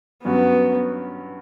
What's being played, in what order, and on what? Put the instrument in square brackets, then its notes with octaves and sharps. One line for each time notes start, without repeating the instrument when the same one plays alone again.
[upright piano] G2 F#3 C#4 F#4 [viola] B3